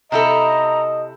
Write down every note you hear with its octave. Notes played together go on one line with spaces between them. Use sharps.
C3 E4 A4 D#5 A#5